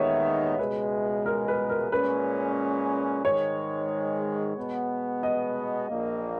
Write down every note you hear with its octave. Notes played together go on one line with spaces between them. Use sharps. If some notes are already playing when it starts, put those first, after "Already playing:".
Already playing: D#2 D#3 G#3 B3 D#4 C#5 D#5 E5
C#2 B2 G#3 B4
A#4
B4
A#4
A#2 G#3 C#4 B4
G#2 D#3 G#3 C#5
B2 G#3 B3
D#5
A#1 A#2 A#3